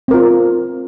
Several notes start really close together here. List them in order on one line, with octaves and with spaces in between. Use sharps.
C4 A#4 F4